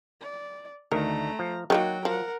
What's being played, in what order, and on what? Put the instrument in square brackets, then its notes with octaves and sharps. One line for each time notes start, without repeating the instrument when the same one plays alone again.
[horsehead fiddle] D5
[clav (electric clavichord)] D2 D#3 [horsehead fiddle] A3 A#5 [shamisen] A#4
[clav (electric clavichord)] F3
[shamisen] D#3 A3 A#3 [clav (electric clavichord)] F#3 [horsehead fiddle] F#4 G5
[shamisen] F3 [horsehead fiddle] A#4 F#5